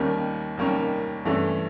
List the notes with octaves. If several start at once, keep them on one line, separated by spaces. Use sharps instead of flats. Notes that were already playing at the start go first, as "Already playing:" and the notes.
Already playing: D#2 D#3 G3 A#3 C#4
D#2 D#3 G3 A#3 C#4
G2 E3 A3 C#4